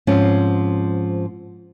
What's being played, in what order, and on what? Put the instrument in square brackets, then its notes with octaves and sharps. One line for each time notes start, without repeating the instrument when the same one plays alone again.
[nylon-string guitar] G#2 F3 C4 C#4